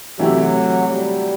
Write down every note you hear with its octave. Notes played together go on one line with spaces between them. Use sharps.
C3 E3 F#3 A3 E4 G4
G3